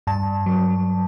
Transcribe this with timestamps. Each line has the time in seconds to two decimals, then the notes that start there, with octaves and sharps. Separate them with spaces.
0.07 G2 A5
0.46 F#3